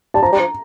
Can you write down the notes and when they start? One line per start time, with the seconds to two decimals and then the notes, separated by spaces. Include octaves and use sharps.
0.14 G3 A5
0.23 F3 A#5
0.32 G3
0.39 F3